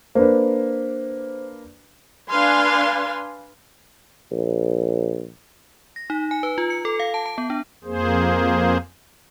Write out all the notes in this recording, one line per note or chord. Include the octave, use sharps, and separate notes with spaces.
A#3 D4 B4 C5
D4 B4 F5 G#5 C6
A#1
A#6
D#4
G#5
B4
F4
C#7
A4
F5
A5
A5
B3
D4
F2 A#3 G#4 C5